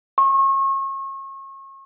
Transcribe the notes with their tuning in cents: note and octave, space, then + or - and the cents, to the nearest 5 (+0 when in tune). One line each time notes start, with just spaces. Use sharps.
C#6 -35